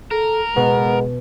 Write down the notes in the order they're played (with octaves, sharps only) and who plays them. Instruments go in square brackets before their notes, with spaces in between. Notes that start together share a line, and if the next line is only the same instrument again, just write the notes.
[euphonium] A4 [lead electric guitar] A#4
[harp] B2 [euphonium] G#3 [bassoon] B3